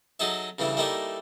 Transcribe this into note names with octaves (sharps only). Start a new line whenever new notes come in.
F#3 D#4 G#4 A4 E5
G2 C#3 E3 A3 E4
G3 A3 A#3 D#4 E4 E5